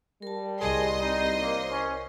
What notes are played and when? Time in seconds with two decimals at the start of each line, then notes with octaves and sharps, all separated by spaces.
0.22 G3 A#4 A5
0.60 C2 G#4 D#5 C6
1.00 C4 D#4
1.41 A#3 A#4 C5 C#5
1.71 C#4